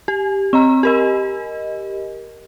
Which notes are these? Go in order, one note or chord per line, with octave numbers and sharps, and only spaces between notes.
G4
C4 D#5 A#5
G4 A#4 D#5